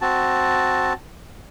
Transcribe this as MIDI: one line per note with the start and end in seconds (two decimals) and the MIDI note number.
0.01 0.93 60
0.01 0.93 66
0.01 0.93 81